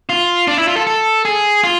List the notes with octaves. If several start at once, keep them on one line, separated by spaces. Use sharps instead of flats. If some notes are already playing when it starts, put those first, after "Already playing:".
F4
D4
E4
F4
A4
A4
G#4
F4